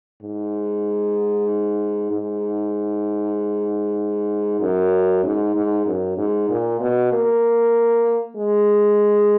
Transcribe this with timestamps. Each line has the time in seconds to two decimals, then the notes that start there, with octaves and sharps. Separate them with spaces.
0.23 G#2
2.11 G#2
4.61 F#2
5.24 G#2
5.55 G#2
5.87 F#2
6.18 G#2
6.50 A#2
6.80 B2
7.12 A#3
8.37 G#3